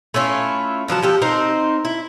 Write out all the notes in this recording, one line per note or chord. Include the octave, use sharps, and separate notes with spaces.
A3 C#4 E4 F4
D3 F3 F#3 A5
F3 G4 A4
C4 D#4 A#4 C5
E4